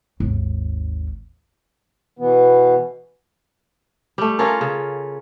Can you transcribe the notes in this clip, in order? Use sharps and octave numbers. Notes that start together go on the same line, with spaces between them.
G#1 D#2
B2 E3 B3
G3 A3
C#4 F4 A4 A#4
C#3